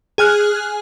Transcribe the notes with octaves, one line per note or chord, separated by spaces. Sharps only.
G#4 G#5 F6 F#6